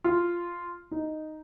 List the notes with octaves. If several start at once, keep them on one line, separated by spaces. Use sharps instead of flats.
F4
D#4